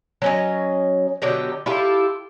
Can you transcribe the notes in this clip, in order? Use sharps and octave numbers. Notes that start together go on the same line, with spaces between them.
F#3 C#4 D#5
B2 D3 F#3 G4
E4 F4 G4 A4